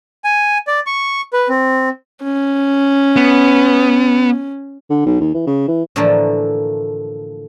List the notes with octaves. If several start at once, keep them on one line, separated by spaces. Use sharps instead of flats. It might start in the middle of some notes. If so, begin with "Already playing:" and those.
G#5
D5
C#6
B4
C4
C#4
B3
D3
B1
D#2
E3
C#3
E3
A2 D3 E3 F3 A3 A#3